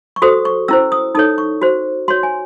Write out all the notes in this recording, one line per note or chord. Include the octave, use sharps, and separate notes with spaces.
C#6
F#4 A4 C5 D#6
C#6
C#4 E4 C5 E6
D#6
D#4 A4 C#5 D#6
C#6
F#4 C5
F#4 C#5 C6
G#5